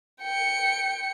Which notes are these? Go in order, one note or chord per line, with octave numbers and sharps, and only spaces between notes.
G5 C#7